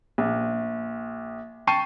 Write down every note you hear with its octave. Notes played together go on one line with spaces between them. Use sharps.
A#1
G5 A5 C#6 C7 D#7